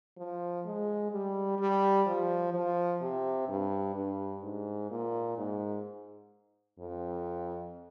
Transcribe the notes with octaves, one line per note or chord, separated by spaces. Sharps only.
F3
G#3
G3
G3
F3
F3
C3
G2
G2
G#2
A#2
G#2
F2